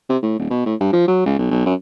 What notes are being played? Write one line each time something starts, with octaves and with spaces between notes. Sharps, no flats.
C3
A2
D#1
B2
A2
G2
F3
F#3
C#2
B1
B1
F#2